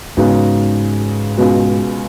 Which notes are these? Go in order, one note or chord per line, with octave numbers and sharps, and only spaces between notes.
G#2 C#3 G#3 B3 D#4 F#4
C#2 B2 G#3 B3 F#4